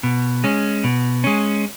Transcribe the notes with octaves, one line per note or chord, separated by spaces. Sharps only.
B2
G#3 C#4
B2
G#3 C#4